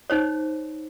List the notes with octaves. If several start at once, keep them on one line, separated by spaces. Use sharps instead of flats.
D#4 C5 C#5